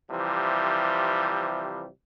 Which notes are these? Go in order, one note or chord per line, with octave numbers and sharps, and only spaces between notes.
C3 E3 F3 G3